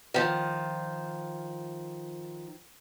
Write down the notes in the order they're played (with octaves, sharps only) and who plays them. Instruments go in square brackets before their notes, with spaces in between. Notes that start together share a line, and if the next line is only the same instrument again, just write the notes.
[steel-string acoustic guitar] D#3 F3